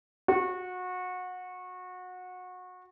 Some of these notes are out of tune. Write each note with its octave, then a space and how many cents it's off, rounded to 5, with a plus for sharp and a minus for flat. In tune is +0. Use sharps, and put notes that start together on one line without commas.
F#4 -25